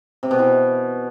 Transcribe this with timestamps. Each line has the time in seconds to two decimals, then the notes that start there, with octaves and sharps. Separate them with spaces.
0.23 C3
0.31 B2
0.39 E3